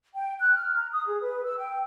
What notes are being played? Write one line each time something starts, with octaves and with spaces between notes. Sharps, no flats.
G5
F#6
F6
A#5
D#6
G#4
B4
E6
G5